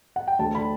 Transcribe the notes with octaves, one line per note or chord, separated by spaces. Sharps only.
F#5
G5
D2 A5
D3 B5